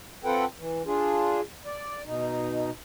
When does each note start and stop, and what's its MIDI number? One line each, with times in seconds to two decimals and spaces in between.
0.25 0.45 60
0.25 0.45 65
0.25 0.45 69
0.25 0.45 71
0.25 0.45 78
0.25 0.45 79
0.58 0.83 52
0.86 1.41 62
0.86 1.41 65
0.86 1.41 68
1.66 2.02 74
2.05 2.70 47
2.05 2.70 63